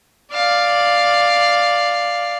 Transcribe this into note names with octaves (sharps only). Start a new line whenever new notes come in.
D5 F5